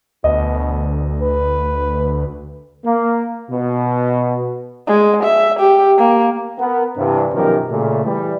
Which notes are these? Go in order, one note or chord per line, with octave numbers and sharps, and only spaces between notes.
D2 B2 D#5
B4
A#3
B2
G#3
E5
G4
A#3
B3 A#4
G2 C3 E3
F#2 B2 D#3 F3 G4 A#4
A#2 C#3 A3
E3 G3